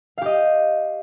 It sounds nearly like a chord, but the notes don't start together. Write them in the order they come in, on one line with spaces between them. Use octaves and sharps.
F5 G4 D#5